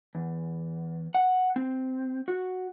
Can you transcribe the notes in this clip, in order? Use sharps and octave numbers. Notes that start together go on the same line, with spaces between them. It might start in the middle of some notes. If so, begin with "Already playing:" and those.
E2
F#5
C4
F#4